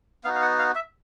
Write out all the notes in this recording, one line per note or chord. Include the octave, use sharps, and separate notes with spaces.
B3 D#4 F#4 F5
F5
F#5
F5
E5